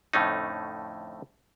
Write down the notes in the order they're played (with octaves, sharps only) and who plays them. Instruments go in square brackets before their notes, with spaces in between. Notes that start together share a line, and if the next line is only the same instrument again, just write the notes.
[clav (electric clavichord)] F2 A2 D3 A3 C#4 D#4